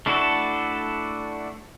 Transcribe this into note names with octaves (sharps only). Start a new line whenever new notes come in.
A3 D4 E4 F#4 A4